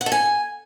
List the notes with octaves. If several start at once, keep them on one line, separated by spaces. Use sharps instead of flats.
F#5
A4
G#5